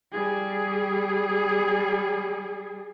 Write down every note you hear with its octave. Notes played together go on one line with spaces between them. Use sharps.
G3 G#4